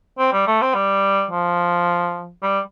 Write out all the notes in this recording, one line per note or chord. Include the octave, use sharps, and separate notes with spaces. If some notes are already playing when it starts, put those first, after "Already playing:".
C4
G3
A3
C4
G3
F3
G3